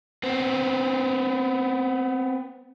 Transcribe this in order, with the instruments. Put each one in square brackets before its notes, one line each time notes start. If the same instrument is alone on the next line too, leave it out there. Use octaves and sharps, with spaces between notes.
[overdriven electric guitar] B3 C4